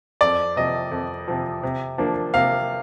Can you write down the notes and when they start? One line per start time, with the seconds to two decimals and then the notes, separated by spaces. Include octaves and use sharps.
0.21 F2 D5
0.56 C3 F3 D#5
0.91 F2
1.28 C3 F3
1.63 C3
1.98 F3 A#3 D4
2.34 C3 F5